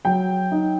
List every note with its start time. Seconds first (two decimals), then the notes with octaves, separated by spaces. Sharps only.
0.05 F#3 G5
0.52 D#4